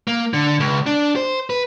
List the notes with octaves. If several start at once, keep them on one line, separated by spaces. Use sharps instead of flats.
A#3
D3
C#2
D4
C5
B4